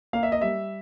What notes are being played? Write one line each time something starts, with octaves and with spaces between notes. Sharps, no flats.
A#3 F5
E5
D#5
G3 E5